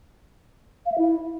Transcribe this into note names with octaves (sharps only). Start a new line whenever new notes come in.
F5
E5
E4